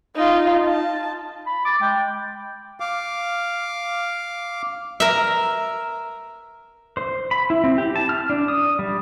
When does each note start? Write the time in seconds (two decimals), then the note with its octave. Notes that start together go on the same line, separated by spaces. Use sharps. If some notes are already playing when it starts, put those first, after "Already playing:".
0.16 D#4 F4
0.64 A5
1.47 B5
1.65 D6 A6
1.81 G#3 G5
2.80 F5 D6
5.00 A#4 E5
6.97 C5
7.31 B5
7.50 E4
7.64 C4
7.78 G4
7.96 A5
8.09 F6
8.30 D4
8.48 D#6
8.79 G3